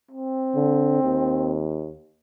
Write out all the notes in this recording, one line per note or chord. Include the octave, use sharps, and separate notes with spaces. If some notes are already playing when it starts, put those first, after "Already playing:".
C4
D3
D#2